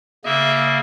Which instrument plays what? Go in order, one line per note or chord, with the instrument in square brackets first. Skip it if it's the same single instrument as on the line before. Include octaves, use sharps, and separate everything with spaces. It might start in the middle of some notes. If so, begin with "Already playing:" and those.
[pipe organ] C#3 A#3 [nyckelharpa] E5